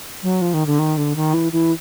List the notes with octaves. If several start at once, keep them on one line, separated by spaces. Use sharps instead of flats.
F#3
F3
D#3
D3
D#3
D3
D#3
E3
E3